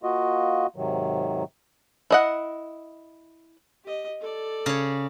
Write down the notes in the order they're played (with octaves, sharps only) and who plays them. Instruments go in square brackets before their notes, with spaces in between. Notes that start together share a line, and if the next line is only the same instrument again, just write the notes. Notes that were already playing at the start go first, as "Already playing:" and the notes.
[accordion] A#3 F4 F#4 D#5
G#2 C3 D#3 F#3
[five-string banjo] E4 D#5 F#5
[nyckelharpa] G4 D#5
A4 D5
[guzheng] C#3 C#5